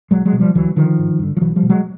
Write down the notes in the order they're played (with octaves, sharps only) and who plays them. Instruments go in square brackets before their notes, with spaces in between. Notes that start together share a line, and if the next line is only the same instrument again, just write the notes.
[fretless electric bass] B1 F#3 G#3
F#3 G#3
B2
F3 G3
D2 E3 F#3
D3 D#3 F3
G#1
G2 D3
F3
B1 E3 F#3
F3 G3
B2
F#3 G#3